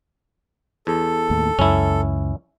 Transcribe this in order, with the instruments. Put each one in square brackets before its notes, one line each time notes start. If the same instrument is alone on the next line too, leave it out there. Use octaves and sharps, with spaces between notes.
[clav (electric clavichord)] E2 [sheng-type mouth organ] A4
[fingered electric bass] D#2 A2
[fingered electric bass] C#2 [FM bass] F#2 [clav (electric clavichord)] C#4 E4